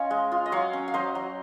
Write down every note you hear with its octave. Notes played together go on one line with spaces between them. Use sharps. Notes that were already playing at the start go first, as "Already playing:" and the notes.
Already playing: C#4 F4 C#5 D#5 F5
G#3
F4
D#5
F#3 C#5 F5
C#4
F5
F#3 C5 D#5
F#3